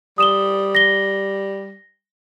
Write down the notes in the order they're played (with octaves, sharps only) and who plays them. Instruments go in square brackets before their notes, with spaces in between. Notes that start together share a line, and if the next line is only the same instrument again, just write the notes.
[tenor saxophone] G3 [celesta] D#6 E7 G7
[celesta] A#6 G7